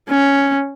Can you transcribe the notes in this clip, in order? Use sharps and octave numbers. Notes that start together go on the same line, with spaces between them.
C#4